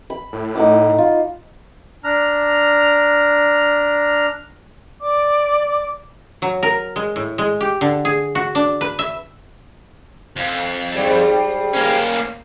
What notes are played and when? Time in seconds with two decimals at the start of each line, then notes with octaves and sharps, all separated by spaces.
0.10 B5
0.33 A2
0.55 D#4 F#5 D6
0.98 F4
2.04 D4 A#5 F6
5.01 D5 D6
6.42 F#3
6.63 A#4
6.96 G#3
7.16 A2
7.38 G#3
7.61 G4
7.81 D3
8.05 G#4
8.35 F#4
8.55 D4
8.81 B4
8.99 E5
10.36 F2
10.95 G#2 G3
11.73 A#3 C#4